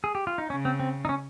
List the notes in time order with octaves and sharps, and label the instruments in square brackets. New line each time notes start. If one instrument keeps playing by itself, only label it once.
[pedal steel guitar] G#4
G4
F4
D#4
[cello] C#3 [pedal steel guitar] C#4
[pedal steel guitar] C4
C4
D#4
C#4